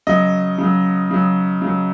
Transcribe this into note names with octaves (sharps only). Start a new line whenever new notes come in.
C#3 F#3 D#5
C#3 F#3
C#3 F#3
C#3 F#3